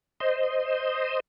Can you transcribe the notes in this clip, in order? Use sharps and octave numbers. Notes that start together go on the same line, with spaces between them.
C5 D#5